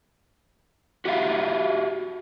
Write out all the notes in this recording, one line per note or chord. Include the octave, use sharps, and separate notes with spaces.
F#4 G4 E5 F5